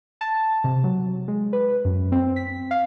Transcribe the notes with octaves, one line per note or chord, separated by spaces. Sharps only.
A5
C3
F#3
G#3
B4
F#2
C4
B6
F5